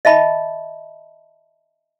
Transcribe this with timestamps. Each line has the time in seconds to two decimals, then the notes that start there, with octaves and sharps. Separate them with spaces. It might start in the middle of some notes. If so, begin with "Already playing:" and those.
0.05 D#5 E5 A5 B5